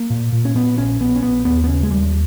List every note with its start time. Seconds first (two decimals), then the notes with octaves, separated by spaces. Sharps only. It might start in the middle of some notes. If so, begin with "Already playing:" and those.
Already playing: A#3
0.10 A#2
0.32 A#2
0.45 C#4
0.55 A#2 B3
0.78 A#1 C#4
1.00 A#1 B3
1.16 C#4
1.23 A#1 B3
1.45 D#2 B3
1.64 B3
1.68 C#3 C#4
1.83 G#3
1.91 D#2 G3